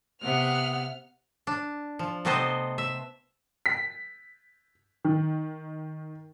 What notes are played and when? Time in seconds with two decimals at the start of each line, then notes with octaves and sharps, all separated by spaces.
0.22 C3 B3 F#5 F6
1.47 D4
1.99 F3
2.25 C3 A3 B3 C4 C5 D#5
2.78 E5
3.66 B6
5.05 D#3